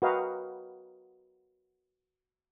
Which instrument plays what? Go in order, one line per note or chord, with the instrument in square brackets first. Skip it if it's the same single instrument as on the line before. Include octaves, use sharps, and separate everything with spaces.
[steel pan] F#4 A#4 B4 D#5 F5 G5